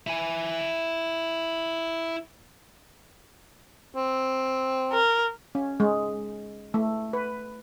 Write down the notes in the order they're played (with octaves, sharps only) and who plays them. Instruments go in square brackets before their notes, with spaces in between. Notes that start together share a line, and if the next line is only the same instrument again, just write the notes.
[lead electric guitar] E4 G#5
[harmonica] C4
[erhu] A#4
[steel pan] C#4
G#3
A3
B4